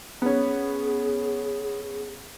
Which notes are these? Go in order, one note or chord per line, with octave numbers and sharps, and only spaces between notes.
B3 C#4 G#4